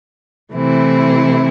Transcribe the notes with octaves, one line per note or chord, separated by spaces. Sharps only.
C3 E3 A3 C4 E4